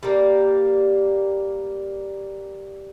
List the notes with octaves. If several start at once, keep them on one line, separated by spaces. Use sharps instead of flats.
G3 A#3